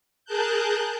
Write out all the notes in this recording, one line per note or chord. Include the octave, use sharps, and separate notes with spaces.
G#4 A#4 A5 F#6 G6